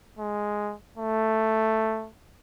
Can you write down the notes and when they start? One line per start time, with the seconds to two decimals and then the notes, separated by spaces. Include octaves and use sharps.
0.19 G#3
0.98 A3